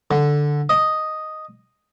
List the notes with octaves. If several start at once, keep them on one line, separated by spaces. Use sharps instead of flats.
D3
D#5